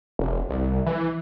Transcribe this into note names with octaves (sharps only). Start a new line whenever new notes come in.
F1
C2
E3